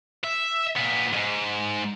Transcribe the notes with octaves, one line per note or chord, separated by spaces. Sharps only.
E5
A#2 B3
F2 G#2